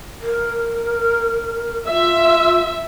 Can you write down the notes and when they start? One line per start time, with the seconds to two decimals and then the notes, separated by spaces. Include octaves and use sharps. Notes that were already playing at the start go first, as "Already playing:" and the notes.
0.21 A#4
1.87 F4 E5